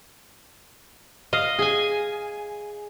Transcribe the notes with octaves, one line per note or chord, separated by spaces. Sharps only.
D#5 F5
G#4 G#5